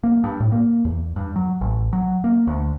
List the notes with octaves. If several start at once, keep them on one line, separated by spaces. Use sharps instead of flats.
A#3
G2
A2
A#3
E2
G2
F#3
A1
F#3
A#3
D2